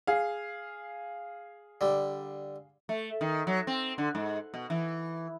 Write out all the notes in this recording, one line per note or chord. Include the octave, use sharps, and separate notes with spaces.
G#4 F5
D3 G3
A3
D#3
F#3
C4
D3
G#2
B2
E3